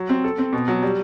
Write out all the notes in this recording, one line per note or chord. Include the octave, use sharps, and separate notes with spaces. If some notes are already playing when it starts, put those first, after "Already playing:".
Already playing: F#3
C4
A4
C4
B2
F#3
G3